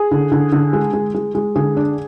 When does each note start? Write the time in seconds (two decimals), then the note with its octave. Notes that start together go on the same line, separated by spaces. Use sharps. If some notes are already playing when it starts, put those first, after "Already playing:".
Already playing: G#4
0.11 D3
0.32 D3
0.52 D3
0.73 G#3
0.93 G#3
1.14 G#3
1.35 G#3
1.56 D3 G#4
1.77 D4